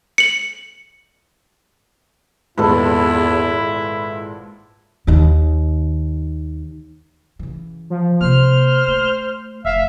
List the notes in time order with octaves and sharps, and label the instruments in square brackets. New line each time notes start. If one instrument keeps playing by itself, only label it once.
[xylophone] C#7 F#7
[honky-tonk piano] G#1 A#2 G#3 [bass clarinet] E2 [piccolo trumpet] E4 [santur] A4 B4
[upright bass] D#2 D#3
C#3 E3
[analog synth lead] F3
[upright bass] C3 A#3 [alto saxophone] C5 [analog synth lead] F6
[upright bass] A3
[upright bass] F1 [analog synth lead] E5 [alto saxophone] F5